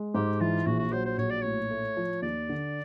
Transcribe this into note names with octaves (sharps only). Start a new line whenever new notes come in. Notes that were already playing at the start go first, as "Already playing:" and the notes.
Already playing: G#3
G#2 G4
E3 F4
A#1 F#4
F#4
F#3 C5
C5
A#1 C#5
D5
A2 C#5
A3
F3
D#2 D5
D3